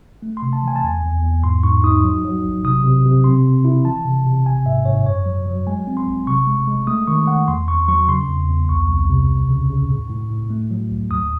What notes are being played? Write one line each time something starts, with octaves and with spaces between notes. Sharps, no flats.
A3
C6
C3
A5
E3 G#5
A5
E2 G#5
E2
E2
G#2 C6
G#2 C#6
D#4 D#6
F#3
F#3
A1
C3 D#6
C3
C3
C4 C6
C3
E4
E3 A5
C3
C3
G#1 G#5
G#2 E5
G#2 C#5
F#2 C#5
F#3
F#3
G#3 G#5
C4
C6
A1
C3 C#6
G#3
G#3
A3 D#6
D#3 C#6
D#3 F#5
E2 C6
E2 C#6
F#3 C#6
C#3 C6
E2
E2
C2 C#6
C2
C3
D#2
C#3
C#3
A2
A2
A2
A3
F#3
C#2
D#2 D#6